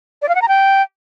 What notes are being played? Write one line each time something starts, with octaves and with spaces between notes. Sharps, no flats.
D5
F5
F#5
A#5
G5